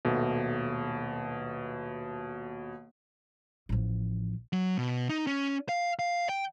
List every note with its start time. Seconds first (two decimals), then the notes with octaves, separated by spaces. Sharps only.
0.05 D#1 B2 A3
3.69 A1 F3
4.53 F#3
4.78 B2
5.09 D#4
5.27 C#4
5.69 F5
5.99 F5
6.29 G5